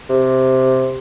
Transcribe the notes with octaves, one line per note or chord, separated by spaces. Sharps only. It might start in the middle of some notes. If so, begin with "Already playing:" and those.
C3